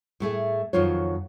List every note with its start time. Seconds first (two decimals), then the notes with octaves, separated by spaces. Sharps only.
0.20 A2 A3 G#4 E5
0.73 F2 D#3 F#3 F4 C5 C#5